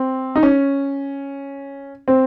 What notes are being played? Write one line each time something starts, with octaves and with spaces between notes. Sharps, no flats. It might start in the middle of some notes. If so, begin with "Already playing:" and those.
Already playing: C4
D#4
C#4
C4